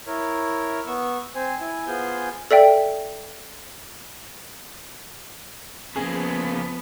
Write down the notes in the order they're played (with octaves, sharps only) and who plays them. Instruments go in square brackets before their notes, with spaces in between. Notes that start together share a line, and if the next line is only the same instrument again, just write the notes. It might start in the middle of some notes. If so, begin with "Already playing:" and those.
[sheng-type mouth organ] E4 A#4 C#5
B3 C#6 E6
C4 C5 G#5
E4 G#5
B3 F4 G#4 C5 G#5 G6
[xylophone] A4 D5 E5 G5
[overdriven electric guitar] C#3 A#3 [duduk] F3 [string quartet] B3 [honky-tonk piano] G#4